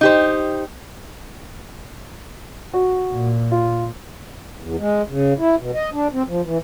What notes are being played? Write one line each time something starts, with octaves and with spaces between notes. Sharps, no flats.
D#4 G4 C5
F#4
A#2
F4
E2
G#3
C#3
E4
B2
D#5
D4
C4
F3
E3